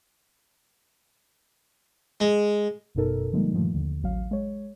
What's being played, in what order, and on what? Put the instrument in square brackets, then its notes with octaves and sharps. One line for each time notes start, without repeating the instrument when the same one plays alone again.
[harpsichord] G#3
[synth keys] G1 F#2 B2 D#4 A4 A#4
D3 F3 G3 G#3 A#3 D#4
G2 A#2 D#3 F3 A3
D#2 D3
A1 F#3 F5
G#3 C#5